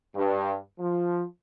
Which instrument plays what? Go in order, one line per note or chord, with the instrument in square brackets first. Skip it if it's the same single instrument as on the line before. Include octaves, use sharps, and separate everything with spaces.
[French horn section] G2
F3